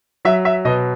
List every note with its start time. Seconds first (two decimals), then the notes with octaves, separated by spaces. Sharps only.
0.25 F#3 E5
0.45 E5
0.65 B2 D#5